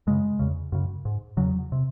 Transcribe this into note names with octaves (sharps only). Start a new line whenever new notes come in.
F#2 C#3 G#3
E2 C#3
F#2 C#3
G#2
E2 C#3 F#3
C3